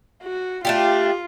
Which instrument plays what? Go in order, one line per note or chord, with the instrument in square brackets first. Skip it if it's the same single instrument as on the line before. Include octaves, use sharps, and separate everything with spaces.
[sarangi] F#4
[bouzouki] A3 D4 G4 [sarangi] F4